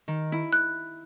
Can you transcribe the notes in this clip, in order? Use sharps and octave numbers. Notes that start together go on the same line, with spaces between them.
D#3
E4
F#6